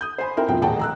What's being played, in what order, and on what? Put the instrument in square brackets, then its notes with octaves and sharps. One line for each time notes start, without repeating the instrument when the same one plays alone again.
[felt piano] D#6 G6
C5 G#5 B5
C4 E4 A#4 G5
E1 B2 F3 C4 G5
D#1 A1 G#4 F#5 G5 A5
A#5 E6 F#6